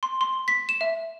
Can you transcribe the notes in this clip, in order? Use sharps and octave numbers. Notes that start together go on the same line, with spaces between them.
C6
C6
B6
E7
E5